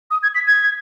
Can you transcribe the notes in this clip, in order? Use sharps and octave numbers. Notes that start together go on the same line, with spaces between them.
D#6
G#6
B6
G#6